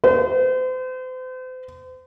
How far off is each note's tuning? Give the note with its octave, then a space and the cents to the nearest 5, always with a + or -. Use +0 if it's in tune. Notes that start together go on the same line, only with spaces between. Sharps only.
C5 -40